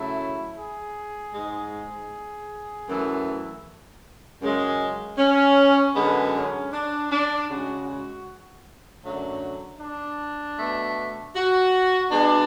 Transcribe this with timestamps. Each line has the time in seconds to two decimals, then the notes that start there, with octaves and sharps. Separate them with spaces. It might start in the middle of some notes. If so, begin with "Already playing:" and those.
Already playing: C#3 F#3 A3 E4
0.57 G#4
1.33 G#2 G#3
2.87 F#2 E3 A3
4.41 F#2 C#3 G#3
5.18 C#4
5.95 F#2 D3 G#3 B3
6.34 C#4
6.72 D4
7.11 D4
7.49 C#3 G#3 F#4
7.88 F#4
9.03 F#2 D3 F#3 A3
9.80 D4
10.58 B2 A3
11.35 F#4
12.11 B2 G#3 D4